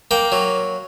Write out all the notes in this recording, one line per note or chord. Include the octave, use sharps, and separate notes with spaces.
A#3 G5
F#3